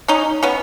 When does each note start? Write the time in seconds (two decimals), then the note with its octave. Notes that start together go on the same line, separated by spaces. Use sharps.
0.08 C#4 D#4
0.43 B3 C#4